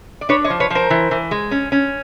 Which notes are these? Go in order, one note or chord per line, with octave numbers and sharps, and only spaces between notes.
D5
D4 B4 C#5
C#5 D#5
F3
B4 C#5
F3 A#4 C5
E3
E3
G#3
C#4
C#4